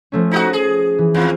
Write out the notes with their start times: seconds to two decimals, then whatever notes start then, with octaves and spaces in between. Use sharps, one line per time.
0.12 F3 A3 C#4
0.31 D#4 E4 F#4 D#6 A#6 B6
0.53 G#4
0.98 E3
1.14 E2 C4 F4